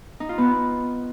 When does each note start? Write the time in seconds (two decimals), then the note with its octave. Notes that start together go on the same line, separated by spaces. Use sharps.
0.20 D#4
0.29 F4
0.38 B3